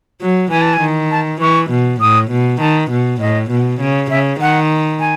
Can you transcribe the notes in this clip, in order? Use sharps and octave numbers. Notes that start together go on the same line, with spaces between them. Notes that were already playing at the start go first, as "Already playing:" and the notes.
F#3
E3 G#5
A5
G#5
D#3
A5
E3 C#6
B2
A2 D#6
B2
D#3 A5
B2
A2 D#5
B2
C#3
C#3 E5
D#3 F#5
G#5